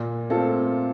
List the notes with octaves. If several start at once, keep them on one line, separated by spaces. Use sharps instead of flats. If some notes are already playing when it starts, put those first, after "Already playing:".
Already playing: A#2
A3 C4 F4 A4